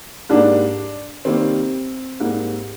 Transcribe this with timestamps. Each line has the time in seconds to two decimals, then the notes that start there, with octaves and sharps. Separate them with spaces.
0.29 G#2 G3 A#3 D4
1.25 C3 D#3 G3 A#3 C4
2.20 G#2 G3 A#3